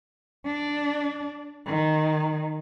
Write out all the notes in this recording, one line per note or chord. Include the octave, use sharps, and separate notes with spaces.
D4
D#3